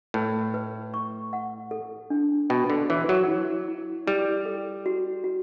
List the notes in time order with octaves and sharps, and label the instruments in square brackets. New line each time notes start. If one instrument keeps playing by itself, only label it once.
[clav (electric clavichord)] A2 [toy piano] B4
[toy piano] B4
C#6
F#5
A4
D4
[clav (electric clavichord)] B2 [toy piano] G5
[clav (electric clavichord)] D3
[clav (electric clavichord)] E3 [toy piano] C#5
[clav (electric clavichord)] F#3
[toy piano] E4
E4
[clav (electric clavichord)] G3 [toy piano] E4
[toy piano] A4
F#4
F#4